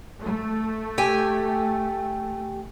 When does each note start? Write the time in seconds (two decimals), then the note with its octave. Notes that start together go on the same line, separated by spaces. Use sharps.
0.23 A3
0.98 G4 G5 G#5